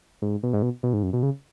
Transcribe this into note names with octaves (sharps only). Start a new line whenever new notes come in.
G#2
B2
G#2
B2
B2
G#2
F#2
B2
C#3